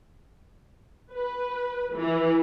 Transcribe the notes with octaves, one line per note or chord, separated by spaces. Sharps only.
B4
E3